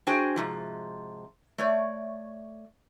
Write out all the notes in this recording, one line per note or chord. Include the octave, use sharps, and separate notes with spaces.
D4 F#4 G#4 C5 G5 G#5
G#2 C3 F3
A3 C#5 D5